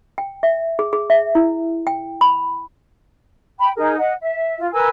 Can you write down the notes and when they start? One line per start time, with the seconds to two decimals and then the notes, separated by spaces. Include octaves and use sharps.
0.18 G5
0.43 E5
0.79 G#4
0.93 G#4
1.10 E5
1.35 E4
1.87 G5
2.21 B5
3.58 G5 B5
3.76 D#4 G#4 A#4
3.97 D#5 F#5
4.20 E5
4.59 F4
4.72 A#4 B4 G#5 E6